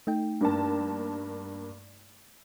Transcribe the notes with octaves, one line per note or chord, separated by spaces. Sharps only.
A3 D#4 G5
G2 A#3 A5